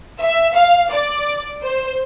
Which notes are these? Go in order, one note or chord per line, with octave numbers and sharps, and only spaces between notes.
E5
F5
D5
C5